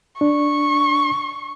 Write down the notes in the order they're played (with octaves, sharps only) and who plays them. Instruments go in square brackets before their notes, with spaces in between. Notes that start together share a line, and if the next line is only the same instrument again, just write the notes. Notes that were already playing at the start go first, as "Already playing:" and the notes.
[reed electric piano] D4 [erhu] C#6